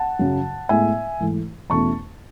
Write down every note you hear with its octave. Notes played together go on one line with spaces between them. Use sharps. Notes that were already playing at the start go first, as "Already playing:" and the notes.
Already playing: F#5 A5
F#2 C#3 F#3
A2 G#3 B3 E4 E5 G#5
G#2 E3 A3 E4
E2 B2 A3 C#4 E4 A5 C#6